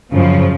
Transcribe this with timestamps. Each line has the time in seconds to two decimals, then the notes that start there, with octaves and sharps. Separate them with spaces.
0.12 F#2 C#3 F3